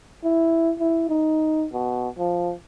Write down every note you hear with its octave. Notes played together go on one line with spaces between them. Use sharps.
E4
E4
D#4
B2
F3